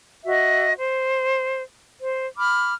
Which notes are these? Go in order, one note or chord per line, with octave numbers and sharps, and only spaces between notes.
F#4 D#5 E5
C5
C5
B5 D6 F6